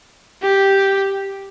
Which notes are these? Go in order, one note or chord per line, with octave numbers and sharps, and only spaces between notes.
G4